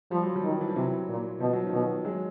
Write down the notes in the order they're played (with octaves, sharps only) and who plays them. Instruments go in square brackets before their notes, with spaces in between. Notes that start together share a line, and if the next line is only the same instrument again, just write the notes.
[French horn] F3 [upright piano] G3
[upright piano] F#3
F3 G3
[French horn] D#3
[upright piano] E3
F3
[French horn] C3 [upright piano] E3 F#3
[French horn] A#2
[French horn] B2 [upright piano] F3
[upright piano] F#3
D#3 F3
[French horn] B2
[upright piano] F#3 G#3